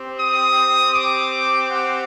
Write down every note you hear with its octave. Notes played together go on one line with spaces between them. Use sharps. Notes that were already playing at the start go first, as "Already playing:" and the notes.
Already playing: C4 G4
D#6
D6
F#5